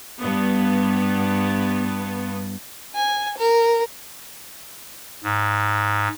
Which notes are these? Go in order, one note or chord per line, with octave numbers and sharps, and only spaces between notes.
G2 B3
G#5
A#4
G#2